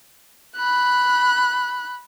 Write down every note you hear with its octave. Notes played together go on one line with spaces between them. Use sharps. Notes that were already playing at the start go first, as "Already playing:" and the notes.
B5 F#6